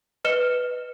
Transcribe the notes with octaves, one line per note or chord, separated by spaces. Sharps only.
B4 D#5 F6 C#7 E7 G7